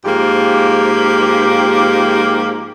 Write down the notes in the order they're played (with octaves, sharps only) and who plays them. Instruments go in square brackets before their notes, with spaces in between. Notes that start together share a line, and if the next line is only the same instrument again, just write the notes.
[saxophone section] G#2 F3 A#3 G4